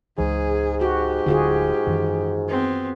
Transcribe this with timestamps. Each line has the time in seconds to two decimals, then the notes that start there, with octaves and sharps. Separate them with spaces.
0.18 C#2 G#2 E3 G#4
0.81 F#4 G4
1.26 D1 D3 F4 F#4 G#4
1.87 F#2 D#3 E3
2.49 B3 C4